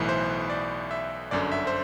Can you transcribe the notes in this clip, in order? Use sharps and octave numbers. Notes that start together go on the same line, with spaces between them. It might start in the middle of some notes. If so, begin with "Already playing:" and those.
Already playing: B1 A2 E3 B4
C5
D5
E5
G1 F#2 D3 D5
E5
C5